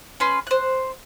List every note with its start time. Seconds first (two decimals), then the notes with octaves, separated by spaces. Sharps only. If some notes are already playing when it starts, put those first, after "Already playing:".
0.20 C#4 B4 C6
0.47 C5 F#6